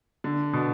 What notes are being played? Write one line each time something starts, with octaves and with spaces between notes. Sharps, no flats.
D3
B2